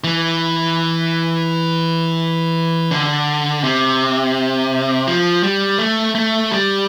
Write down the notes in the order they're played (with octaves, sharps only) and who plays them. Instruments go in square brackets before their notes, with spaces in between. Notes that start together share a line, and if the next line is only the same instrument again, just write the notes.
[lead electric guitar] E3
D3
C3
F3
G3
A3
A3
G3